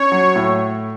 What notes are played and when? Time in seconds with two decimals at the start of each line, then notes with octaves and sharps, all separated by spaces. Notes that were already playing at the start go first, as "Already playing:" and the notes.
Already playing: C#4 C#5
0.12 F#3
0.36 A2